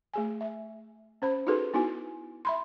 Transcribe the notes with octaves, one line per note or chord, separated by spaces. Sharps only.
A3 G#4 G#5
E5
C#4 C5 B5
D#4 F4 F#4 G#4 A4 B4
B3 D#4 E4 F#4 G#5
E5 B5 C6